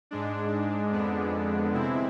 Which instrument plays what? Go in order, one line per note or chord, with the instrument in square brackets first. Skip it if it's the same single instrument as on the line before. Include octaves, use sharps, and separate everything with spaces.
[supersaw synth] G#2 G#3 D4
F2 D3 G#3 B3 D4
C3 G#3 C4 E4